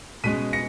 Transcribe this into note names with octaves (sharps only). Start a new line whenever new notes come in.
B2 G#3 C#4 B6 D#7
A#6 C#7